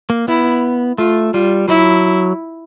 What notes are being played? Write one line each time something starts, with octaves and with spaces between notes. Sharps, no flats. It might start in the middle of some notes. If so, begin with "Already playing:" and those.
A#3
B3 E4
A3 F4
G3 F4
F#3 E4